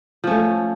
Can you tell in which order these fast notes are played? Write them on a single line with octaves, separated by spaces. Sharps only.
F3 C#4 A3